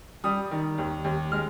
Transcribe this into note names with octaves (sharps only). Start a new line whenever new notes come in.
G3 D#6
D#3
D#2
D#2
G#3 F6